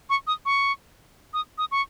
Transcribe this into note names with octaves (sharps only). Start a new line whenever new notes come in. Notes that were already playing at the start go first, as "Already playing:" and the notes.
C#6
D#6
C#6
D#6
D#6
C#6